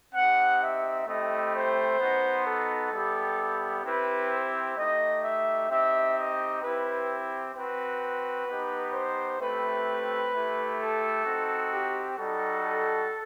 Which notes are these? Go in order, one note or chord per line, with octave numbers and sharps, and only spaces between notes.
C4 D#4 G4 F#5
E5
A3 C4 E4 G4 D#5
C5
B3 D#4 F#4
A4
G3 B3 E4 G4
C4 E4 G4 B4
C5
A3 D#4 G4 D#5
E5
C4 D#4 G4 E5
D#5
C4 E4 G4 B4
C4 F#4 B4
B3 D#4 G4
C5
A3 C4 E4 G4 B4
A3 E4 G4
A4
C4 D#4 F#4
G4
G3 D#4 F#4 A4